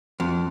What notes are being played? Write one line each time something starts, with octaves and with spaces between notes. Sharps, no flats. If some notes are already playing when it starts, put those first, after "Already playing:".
F2